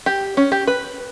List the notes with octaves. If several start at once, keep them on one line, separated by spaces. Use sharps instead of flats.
G4
C#4
G4
B4